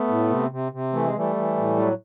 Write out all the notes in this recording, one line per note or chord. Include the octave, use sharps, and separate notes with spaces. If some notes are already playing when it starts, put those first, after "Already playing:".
Already playing: A3 B3
A2
C3
C3
C3
E3 A3
G#3
E3 G3 A3
E3
A2
F#3